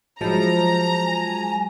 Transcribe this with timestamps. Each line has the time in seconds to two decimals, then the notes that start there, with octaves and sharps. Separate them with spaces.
0.21 F3 F#3 G#3 E4 A5 A#5
1.06 G#5